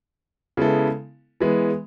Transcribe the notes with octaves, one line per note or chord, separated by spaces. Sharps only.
C#3 G#3 B3 E4 A4
E3 G#3 B3